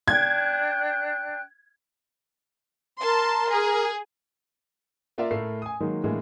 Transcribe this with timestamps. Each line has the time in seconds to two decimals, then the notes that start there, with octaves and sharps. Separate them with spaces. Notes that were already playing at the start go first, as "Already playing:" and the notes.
0.08 D4 G5 F#6 G#6
3.01 A#4 A5 C6
3.51 G#4
5.18 A#3 F4 A#4 D5 E5 F5
5.31 A2 A3 A#4 C7
5.62 G#5 D#6
5.80 D#3 F#3 G#3 A#3
6.04 A2 D3 E3 G#3 A#3